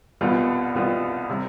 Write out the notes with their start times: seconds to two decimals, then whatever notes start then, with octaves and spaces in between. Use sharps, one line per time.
0.21 C2 B2 G3 B3 F4
0.75 C2 B2 G3 B3 F4
1.30 C3 G3